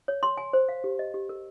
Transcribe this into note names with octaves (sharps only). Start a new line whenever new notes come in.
C#5
C6
G#5
C5
F5
G4
D#5
G4
A#4